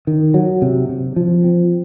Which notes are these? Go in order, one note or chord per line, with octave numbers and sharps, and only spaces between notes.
D#3
F#3
C3
C3
F3
C4